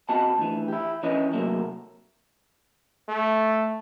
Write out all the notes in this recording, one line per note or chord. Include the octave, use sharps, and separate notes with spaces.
C4 F#4 D#5 A5
D2 E3
E4 G4
E3 C#4 B4 D#5
C3 F#3 A3 A#3
A3